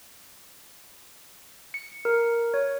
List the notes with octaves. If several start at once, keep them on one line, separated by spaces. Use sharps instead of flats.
C#7
A#4
C#5